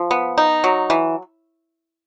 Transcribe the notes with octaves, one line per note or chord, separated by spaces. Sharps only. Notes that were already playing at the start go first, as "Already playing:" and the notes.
Already playing: F3
B3
D#4
F#3
E3